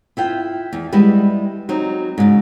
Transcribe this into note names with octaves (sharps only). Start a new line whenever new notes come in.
E4 F4 G5
E2
G3 G#3 B3 E4
F#3 C4 D#4
G#2 C#3